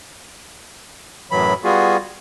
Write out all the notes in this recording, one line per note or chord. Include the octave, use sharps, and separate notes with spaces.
F#2 A2 E3 F#3 B5
G3 B3 F4 F#4 G#4